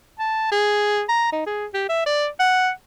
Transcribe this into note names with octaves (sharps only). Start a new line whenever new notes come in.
A5
G#4
A#5
D#4
G#4
G4
E5
D5
F#5